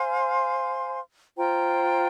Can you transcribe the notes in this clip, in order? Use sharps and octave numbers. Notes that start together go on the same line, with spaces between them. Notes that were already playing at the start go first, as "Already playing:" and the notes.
Already playing: C5 F5 G#5 C6
F4 C5 G5 A#5